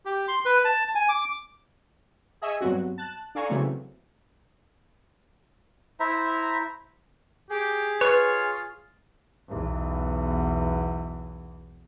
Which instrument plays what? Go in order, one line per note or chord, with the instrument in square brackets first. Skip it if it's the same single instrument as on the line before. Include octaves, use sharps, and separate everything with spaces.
[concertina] G4
C6
B4
A5
G#5
D6
[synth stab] G#4 D#5 E5 G#5 C#6 E6
G2 F#3 B3 C4 F#4
A5 F#6
D4 A4 F5 G#5 A#5 C#6
C#3 E3 F#3 G#3 A3 C4
[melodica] E4 C5 E5 A#5
[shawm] G4 [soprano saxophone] G#4
[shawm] F4 [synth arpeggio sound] B4 C#6 [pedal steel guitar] C#5
[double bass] B1 E2